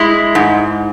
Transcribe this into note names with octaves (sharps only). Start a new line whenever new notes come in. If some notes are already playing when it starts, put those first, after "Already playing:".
Already playing: G#3 E4
G#2